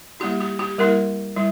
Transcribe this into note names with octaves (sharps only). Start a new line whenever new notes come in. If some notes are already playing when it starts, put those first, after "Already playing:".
G3 A#3 E4 G4
G4
G4
G3 A#3 E4 A#4
G3 E4